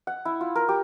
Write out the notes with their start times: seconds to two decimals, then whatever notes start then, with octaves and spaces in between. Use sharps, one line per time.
0.07 F#5
0.25 E4
0.41 F4
0.55 A#4
0.69 G4